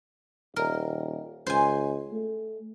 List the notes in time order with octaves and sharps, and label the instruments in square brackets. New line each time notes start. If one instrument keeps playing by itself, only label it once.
[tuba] D#1 [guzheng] A#4
[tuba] C#2 [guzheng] C5 G#5
[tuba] A3